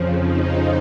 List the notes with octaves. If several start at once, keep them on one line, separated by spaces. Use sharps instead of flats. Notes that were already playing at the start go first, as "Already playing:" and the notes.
Already playing: F2 C#3 F3
D#4